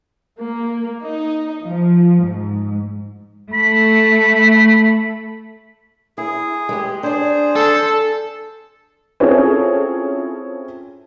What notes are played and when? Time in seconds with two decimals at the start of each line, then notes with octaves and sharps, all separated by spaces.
0.40 A#3
1.03 D#4
1.65 F3
2.22 G#2
3.53 A3 B5
6.18 E4 G#4
6.69 G#3 G4
7.03 D4 G#4 C5 D5
7.55 A4
9.20 C4 C#4 E4 F4 G#4 A4